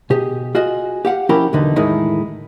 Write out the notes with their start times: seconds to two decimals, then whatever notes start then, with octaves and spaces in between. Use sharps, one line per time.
0.10 B2 G4 G#4
0.55 F4 F#4 G#4 D#5
1.05 G4 F5 F#5
1.29 F3 C#4 E4 G4 A#4 B5
1.53 B1 E2 D3 D#4 B4
1.76 E2 A2 D#3 G#3 D#4 E4